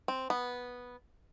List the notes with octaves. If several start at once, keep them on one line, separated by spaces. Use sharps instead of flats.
C4
B3